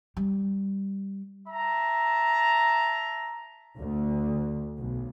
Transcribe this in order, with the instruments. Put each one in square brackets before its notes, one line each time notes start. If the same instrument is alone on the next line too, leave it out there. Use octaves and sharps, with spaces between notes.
[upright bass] G3
[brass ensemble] E5 A5 A#5
[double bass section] D2
B1